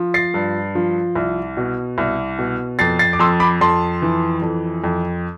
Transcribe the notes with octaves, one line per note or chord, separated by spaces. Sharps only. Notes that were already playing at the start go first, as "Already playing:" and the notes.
Already playing: F3
A6 C7
G2
F3
C2
B2
C2
B2
F2 A6 C7
A6 C7
D6
F2 C6 E6
B5 D6
F2 A5 C6
E3
F2
F2